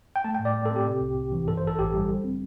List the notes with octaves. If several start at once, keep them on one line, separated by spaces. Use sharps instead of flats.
G5
A3 A5
G5
A2
D5
A2
A4
C4
G4
C3
C2
C2
E3
G2 A4
C5
A1
A4
A1 G4
G3
D3
C4